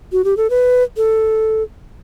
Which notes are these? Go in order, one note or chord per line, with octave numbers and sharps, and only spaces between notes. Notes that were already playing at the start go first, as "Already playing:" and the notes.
F#4
G4
A4
B4
A4